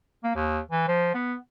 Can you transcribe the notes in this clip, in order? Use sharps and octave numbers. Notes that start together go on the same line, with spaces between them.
A#3
D#2
E3
F3
B3